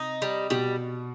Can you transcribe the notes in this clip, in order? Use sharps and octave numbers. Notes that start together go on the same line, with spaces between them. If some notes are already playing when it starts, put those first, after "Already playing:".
Already playing: C3 D#4
G3
B2 G3